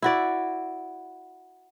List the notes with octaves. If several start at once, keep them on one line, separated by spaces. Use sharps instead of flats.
E4 F#4 D5